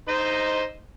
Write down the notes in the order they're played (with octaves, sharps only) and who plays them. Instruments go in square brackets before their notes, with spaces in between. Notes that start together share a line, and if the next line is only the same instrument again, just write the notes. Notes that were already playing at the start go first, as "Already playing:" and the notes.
[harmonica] D#4 C5 D#5